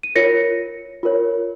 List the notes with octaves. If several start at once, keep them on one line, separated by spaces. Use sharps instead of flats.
D#7
F4 A#4 C#5 A#6 C#7
F4 A#4 C#5